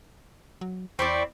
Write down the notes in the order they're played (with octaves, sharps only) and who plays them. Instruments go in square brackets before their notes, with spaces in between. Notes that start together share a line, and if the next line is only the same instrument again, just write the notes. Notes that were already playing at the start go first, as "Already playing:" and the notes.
[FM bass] F#3
[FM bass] E2 [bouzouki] C4 E4 D5 [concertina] G5 B5 C#6